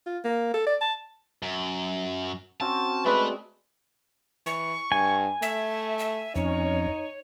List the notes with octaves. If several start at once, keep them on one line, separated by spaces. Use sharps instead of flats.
F4
A#3
A4
D5
A5
F#2
C4 C#4 F#4 A5
G#3 A3 B4 D5
E3 C#6
G2 G#5
A3 E5
E5
F2 C#4 D#4 C#5